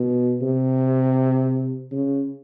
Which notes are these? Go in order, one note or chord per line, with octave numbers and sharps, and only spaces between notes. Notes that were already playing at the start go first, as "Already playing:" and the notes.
Already playing: B2
C3
C#3